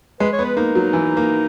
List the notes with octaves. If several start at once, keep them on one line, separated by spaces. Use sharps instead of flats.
G#3 B4
C#5
B3
B4
A#3 D#4
F#3
E3
A#3